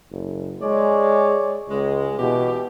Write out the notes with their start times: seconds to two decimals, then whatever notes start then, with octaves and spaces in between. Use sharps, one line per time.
0.11 F#1
0.62 G#3 C#5 D5
1.69 C#2 G#3
2.19 B2 E3 G4